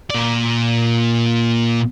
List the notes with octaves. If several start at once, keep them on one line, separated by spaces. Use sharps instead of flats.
A#2 D5